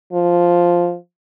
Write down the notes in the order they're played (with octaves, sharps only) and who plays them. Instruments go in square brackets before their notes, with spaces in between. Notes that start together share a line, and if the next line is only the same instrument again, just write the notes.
[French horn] F3